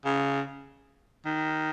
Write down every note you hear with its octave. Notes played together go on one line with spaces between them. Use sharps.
C#3
D#3